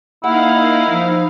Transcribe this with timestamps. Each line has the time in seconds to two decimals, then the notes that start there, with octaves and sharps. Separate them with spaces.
0.24 A#3 D#4 E4 F5 F#5
0.90 F3